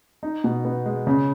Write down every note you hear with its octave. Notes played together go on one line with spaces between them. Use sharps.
D#4
B2
B3
G#3
C#3